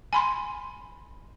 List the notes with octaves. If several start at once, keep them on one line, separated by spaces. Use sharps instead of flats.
G#5 B5 C6